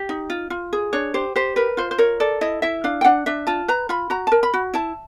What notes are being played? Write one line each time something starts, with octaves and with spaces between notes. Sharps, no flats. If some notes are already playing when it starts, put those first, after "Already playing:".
Already playing: G4
D#4
F4
F4
G#4
D4 C#5
G4 C5
G4 C5
A#4 B4
F4 C5
C5
A#4 C#5
A4 D5
E4 D#5
E4 E5
D4 F5
G5
D4 F#5
D4 E5
F4 A5
B4 A#5
F4 B5
F#4 A#5
A#4 A5
B5
F#4
E4 A5